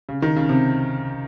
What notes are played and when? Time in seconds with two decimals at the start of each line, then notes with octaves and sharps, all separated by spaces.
0.09 C#3
0.22 D#3
0.36 C#3
0.49 C3